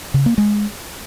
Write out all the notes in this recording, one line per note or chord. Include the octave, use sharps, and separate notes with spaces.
C#3
A#3
G#3